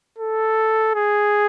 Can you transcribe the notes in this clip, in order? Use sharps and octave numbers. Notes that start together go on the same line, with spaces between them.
A4
G#4